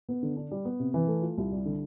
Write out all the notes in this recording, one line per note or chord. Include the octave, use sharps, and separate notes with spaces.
B3
D3
D4
G3
B3
C3
E3
A3
F4
C2
G3
D3